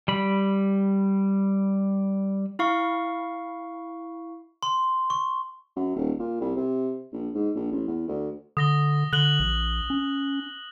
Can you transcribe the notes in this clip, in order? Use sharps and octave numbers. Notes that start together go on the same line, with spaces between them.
G3 B5
E4 F5 C#6
C6
C#6
F#2
D#1
A#2
C2
C3
A#1
G#2
A#1
A1
E2
D2
D3 D#6 A#6 G7
D3 F#6 F#7 G7
A#1
C#4